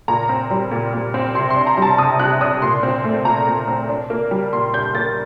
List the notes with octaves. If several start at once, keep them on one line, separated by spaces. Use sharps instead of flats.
A#2 A#5
C4
G3
A#2
A#2
C4
C3 C6
C6
D4
A#5
G3
A5
C3 D#6
C3 F#6
D4 D#6
A#2 C6
C4
A3
A#2 A#5
A#2
C4
D4
A#3
G3
A#2 C6
D4 G6
A#3 A6